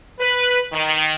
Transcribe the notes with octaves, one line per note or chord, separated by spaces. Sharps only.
B4
D#3